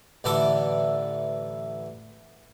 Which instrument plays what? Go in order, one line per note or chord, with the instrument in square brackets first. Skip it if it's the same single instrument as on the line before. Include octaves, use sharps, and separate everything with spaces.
[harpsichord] A1 D3 E3 A4 D6